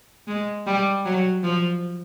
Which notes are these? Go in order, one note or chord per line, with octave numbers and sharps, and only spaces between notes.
G#3
G3
F#3
F3